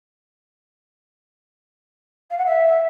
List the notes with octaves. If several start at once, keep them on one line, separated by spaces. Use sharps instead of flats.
F5
F#5
E5